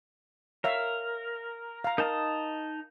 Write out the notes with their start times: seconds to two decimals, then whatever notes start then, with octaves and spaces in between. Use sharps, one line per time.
0.64 A#4 C#5 E5 F5
1.84 F5 A#5
1.98 D#4 A#4 A5 D#6